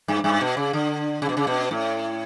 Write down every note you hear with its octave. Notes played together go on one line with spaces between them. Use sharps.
G2
G2
B2
C#3
D3
C#3
B2
C#3
B2
A2